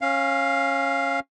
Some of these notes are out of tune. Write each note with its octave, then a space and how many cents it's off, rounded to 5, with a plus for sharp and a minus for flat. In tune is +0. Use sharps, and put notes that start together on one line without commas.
C#4 -20 F5 +0